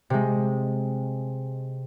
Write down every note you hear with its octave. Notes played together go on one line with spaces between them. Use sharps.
C3 G#3